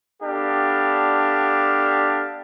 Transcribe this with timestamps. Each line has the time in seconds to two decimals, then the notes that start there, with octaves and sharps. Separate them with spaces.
0.23 B3 D4 G4 A4 F5